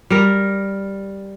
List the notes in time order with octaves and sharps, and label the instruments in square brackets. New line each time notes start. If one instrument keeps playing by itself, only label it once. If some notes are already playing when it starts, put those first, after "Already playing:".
[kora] G3 A#4